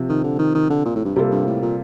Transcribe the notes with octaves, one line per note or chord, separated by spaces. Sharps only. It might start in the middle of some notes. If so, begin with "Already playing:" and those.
Already playing: C3 F3 C4
D#3
D3
D#3
D#3
D3
A#2
A2
G2
C3 G3 A#3 F4 A4
G2
A2
A#2